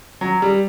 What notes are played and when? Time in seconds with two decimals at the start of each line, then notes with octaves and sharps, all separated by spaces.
0.21 F#3
0.42 G3